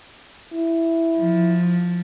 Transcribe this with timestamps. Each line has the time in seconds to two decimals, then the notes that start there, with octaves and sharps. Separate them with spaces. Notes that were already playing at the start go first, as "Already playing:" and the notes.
0.53 E4
1.18 F3